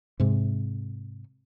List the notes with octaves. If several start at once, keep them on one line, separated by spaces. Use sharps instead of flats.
G#2 C3